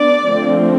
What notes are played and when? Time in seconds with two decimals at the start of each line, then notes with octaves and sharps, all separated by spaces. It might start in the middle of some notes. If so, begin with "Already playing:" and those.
Already playing: B3 D4 D5
0.25 D3 F3 A3 C4